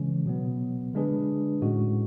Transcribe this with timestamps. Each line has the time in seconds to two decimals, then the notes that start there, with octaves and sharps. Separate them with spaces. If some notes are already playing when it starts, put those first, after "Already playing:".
Already playing: C#3 E3 G#3 C#4
0.26 B2 F#3 B3
0.94 D3 G#3 D4 G#4 B4
1.62 A2 G#3 C#4 F#4